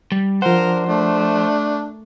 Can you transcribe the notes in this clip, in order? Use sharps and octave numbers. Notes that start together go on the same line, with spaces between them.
G3
F3 D4 A#4 C5 F#5
A3 D4